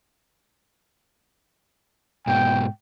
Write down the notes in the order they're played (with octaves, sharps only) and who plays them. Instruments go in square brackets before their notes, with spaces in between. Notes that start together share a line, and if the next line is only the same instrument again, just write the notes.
[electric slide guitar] G#2 B2 [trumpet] G5